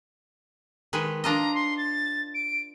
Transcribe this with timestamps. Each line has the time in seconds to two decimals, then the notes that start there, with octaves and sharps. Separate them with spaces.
0.93 D#3 G#3 B4
1.24 D4 F4 D#5 A#5
1.54 C6
1.77 A6
2.34 D7